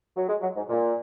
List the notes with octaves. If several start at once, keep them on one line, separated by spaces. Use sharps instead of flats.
F#3
G#3
F#3
G#2
A#2